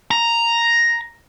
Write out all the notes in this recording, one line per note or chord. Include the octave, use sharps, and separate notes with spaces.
A#5